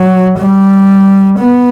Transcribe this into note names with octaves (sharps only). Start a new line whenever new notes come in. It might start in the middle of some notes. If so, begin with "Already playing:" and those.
Already playing: F#3
G3
B3